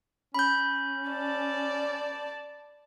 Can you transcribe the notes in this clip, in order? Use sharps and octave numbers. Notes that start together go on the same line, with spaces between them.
C#4 B5 G6
D5 A5